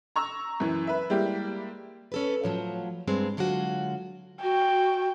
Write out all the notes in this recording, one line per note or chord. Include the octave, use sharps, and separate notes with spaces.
A#5 C#6 E6
F#2 E3
B4 E5
G3 G#3 A#3 E4 G4
C#4 A4 B4
A2 F3 F#3
G2 G#3 C4
D3 F#3 G#3 F4 F#4
F#4 G5